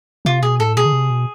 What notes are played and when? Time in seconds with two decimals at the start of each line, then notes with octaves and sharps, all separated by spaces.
0.25 C3 F4
0.43 B2 G#4
0.60 A2 A4
0.77 B2 G#4
0.85 D3
0.93 C3
1.10 B2